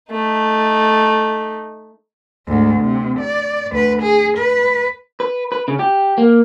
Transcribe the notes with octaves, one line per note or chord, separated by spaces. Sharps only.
A3 D#4
D2 G#2
C3
D5
D2 B4
G#4
B4
B4
B4
C#3
G4
A#3